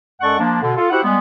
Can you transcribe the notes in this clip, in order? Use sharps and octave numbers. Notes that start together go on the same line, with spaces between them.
F#2 G#3 A4 D5 F#5 C#6
F3 A#3 D4
B2 D3
F4 A4
E4 F#4 G4 C5 F#5
G3 G#3 B3